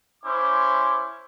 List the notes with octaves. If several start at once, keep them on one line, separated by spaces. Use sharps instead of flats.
C#4 E4 C5 D6